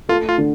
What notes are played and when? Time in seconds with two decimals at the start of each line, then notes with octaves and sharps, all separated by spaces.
0.09 A3 F4
0.29 F4
0.38 D3